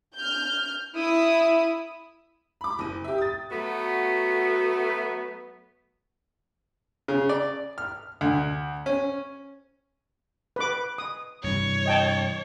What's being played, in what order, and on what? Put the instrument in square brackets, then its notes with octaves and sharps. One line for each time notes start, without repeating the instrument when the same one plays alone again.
[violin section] F6 G6
E4 D#6
[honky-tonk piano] B5 D6
F#1 D#7
G4 E5
D#6 A6
[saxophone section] F#3 A3 B3 F#4
[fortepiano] C#3
D5
F6
D2
C#4
[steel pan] B4 D6
D#6
[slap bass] G2 C3 E3 [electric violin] C#5
[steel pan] D#5 G5 A5